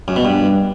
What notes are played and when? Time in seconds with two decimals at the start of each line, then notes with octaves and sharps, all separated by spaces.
0.08 F#2
0.16 B2
0.25 G2